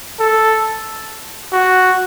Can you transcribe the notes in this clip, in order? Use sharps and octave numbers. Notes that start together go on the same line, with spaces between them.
A4
F#4